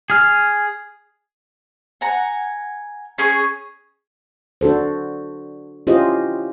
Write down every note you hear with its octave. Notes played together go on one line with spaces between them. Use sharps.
G#4 F6
F#5 G#5 A#5
C#4 G#4 C#6
D4 F#4 A4 C5
C#4 E4 F4 G4 C5 D#5